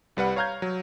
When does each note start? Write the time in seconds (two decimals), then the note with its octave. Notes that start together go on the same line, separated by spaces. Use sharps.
0.17 C2 G3 B4 F#5
0.36 C#5 F5 A#5 F6 G6 G#6
0.62 F#3